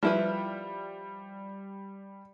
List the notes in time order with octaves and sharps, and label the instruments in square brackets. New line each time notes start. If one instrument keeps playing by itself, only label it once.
[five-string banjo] F3 E4 B4 [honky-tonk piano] G3